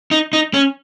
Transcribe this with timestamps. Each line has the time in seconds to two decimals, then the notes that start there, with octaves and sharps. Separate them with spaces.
0.11 D#4
0.33 D#4
0.54 C#4